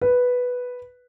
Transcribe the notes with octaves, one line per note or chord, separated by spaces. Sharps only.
B4